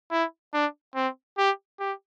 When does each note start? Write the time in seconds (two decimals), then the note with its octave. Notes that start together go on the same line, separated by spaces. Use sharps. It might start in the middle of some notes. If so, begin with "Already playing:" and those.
0.11 E4
0.53 D4
0.95 C4
1.38 G4
1.79 G4